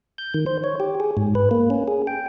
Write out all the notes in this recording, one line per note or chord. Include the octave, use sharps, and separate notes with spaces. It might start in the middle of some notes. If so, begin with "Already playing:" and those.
G6
D#3
C5
C#5
G4
G#4
G#2
B4
A#3
C#4
G#4
G5